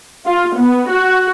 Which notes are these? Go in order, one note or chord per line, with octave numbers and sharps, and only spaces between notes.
F4
B3
F#4